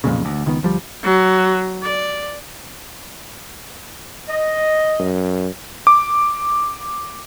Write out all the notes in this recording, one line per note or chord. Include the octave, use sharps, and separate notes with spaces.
B1 F2 A#2 C#3
D2
C#2 D#3 B3
D2 F3 G3
F#3
D5
D#5
F#2
D6